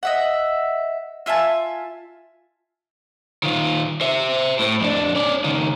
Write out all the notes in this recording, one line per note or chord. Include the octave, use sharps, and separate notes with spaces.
D#5 E5 F#5
F4 E5 G#5 A5
D#3 F4
C5 E5
A2
F2 D4
C#4 D5
C#2 D#3